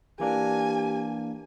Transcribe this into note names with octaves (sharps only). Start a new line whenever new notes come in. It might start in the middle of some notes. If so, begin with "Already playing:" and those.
E3 A#3 D4 G4 G#5